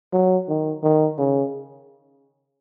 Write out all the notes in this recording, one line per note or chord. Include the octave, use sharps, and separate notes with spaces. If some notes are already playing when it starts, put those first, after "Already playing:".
F#3
D#3
D#3
C#3